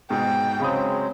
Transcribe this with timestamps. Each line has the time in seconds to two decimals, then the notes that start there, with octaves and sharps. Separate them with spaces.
0.10 G#2 B2 G5
0.60 C#3 F#3 G#3 C4 B5 D#6